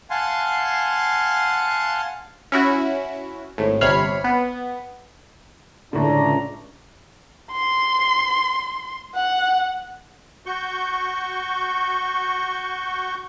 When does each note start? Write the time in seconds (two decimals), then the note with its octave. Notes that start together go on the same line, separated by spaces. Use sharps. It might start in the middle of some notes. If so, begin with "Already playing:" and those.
0.10 F5 F#5 G#5 A5 C6
2.52 C#4 E4 F#4
3.58 G#1 A2
3.81 G1 C3 C#5 B5 F6 C7
4.24 B3
5.93 C#2 A2 D3 D4 A#5
7.52 C6
9.15 F#5
10.46 F#4 C#6 G6